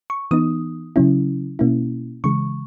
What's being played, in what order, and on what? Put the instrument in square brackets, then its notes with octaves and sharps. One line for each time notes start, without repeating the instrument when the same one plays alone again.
[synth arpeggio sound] C#6
E3 B3 D#4 D#6
C#3 F#3 C#4 E4
B2 A#3 C#4 E4
C#3 E3 G#3 C#6